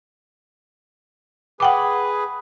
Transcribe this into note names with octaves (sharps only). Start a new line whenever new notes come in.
G#4 B4 F#5 G5 D6